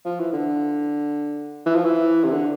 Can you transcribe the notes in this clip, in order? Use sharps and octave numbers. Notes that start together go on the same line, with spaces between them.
F3
E3
D3
E3
F3
E3
C3
D3